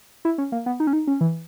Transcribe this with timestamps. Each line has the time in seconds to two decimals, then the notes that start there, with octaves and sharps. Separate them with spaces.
0.25 E4
0.38 C#4
0.52 A#3
0.66 B3
0.80 D#4
0.87 C#4
0.93 D#4
1.07 C#4
1.21 E3